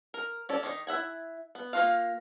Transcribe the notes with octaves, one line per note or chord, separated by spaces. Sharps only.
A#4
C#4 A4 D5
D#3 D#4
E4 E5 F#5 G#5
B3
A#3 C#4 F4 F#4 F5